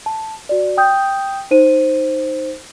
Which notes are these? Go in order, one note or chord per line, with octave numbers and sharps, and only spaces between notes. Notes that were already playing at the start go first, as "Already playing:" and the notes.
A5
F#4 D5
G5 D#6 G6
D#4 C5 D#7